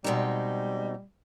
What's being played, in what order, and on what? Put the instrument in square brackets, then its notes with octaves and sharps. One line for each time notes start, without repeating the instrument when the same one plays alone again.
[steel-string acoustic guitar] B2 G#3 C4 D#4 [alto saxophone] G3